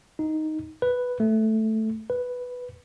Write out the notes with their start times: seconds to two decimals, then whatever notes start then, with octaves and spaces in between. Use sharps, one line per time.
0.19 D#4
0.82 B4
1.20 A3
2.10 B4